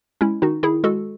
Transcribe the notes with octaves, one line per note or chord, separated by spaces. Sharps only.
G#3 C#4 E4
D#3 D#4 F#4
D#3 E4 G#4
G#3 F#4 A4